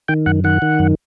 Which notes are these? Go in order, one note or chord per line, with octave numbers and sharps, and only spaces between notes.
D#3 G5
F#2 F#5
D#3 F#5
D#3
F#2